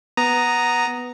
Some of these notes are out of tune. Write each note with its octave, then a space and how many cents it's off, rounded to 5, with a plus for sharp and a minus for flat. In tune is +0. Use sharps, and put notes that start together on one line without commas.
B3 +0 A#5 +0 D#6 +0